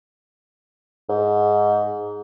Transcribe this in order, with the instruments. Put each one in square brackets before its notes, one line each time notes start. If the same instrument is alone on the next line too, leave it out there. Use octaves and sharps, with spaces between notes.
[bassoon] G#2